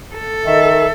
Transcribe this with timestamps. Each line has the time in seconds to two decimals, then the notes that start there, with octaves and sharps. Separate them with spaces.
0.15 A4
0.46 D#3 E5